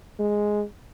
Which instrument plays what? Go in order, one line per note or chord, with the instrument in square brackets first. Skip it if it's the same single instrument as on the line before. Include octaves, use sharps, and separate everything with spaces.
[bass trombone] G#3